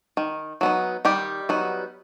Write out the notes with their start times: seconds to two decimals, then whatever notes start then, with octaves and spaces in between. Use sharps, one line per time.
0.17 D#3
0.61 F#3 B3 D#4
1.05 D#3 G3 G4
1.49 F#3 B3 D#4